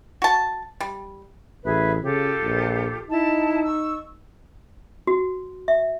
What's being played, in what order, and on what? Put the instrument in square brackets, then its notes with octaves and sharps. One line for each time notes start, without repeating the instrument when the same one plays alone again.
[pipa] F#4 A5
G3
[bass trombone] A1 [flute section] G#4 B4 E5
[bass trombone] C#3 [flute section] F4 G4 A4
[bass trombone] A#1
[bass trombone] D#4 [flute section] E4 A5
[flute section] C#6 E6
[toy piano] F#4
E5